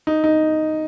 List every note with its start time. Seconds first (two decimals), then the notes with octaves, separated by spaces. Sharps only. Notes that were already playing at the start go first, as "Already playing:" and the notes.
0.07 D#4
0.24 D#4